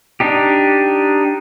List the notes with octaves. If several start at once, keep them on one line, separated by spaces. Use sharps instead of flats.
D4 D#4 G4